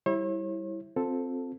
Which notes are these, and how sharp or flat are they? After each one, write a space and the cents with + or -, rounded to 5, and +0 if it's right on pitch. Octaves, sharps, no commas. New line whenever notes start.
G3 +0 E4 -5 C#5 -45
C4 +0 F4 +20 A4 +0